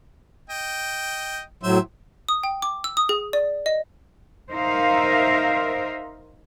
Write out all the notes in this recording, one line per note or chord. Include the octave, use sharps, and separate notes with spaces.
D#5 G5
A2 F#3 C5 E5
D#6
G5
D6
E6
D#6
G#4
D5
D#5
D#4 A#4 C5 E5 F5